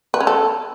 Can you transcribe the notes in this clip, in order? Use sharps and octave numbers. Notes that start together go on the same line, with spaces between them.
B4
C#4
A4